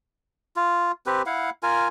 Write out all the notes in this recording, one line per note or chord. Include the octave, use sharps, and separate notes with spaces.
F4
C4 G4 B4
E4 F5 F#5
F4 A#4 G#5